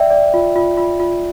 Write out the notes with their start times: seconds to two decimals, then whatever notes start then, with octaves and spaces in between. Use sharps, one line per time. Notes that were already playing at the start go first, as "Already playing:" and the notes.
Already playing: D5 E5 G5
0.10 D5
0.34 F4
0.56 F4
0.77 F4
1.00 F4